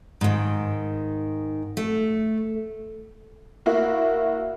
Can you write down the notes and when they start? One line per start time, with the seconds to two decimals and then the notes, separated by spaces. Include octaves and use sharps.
0.21 G#2 D#3
1.77 A3
3.66 A#3 E4 F#4